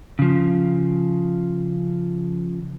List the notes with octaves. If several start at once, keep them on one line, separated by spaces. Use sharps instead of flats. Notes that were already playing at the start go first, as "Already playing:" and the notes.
C#3 F3